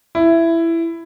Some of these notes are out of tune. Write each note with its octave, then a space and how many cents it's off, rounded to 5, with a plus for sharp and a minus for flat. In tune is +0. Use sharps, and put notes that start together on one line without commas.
E4 +10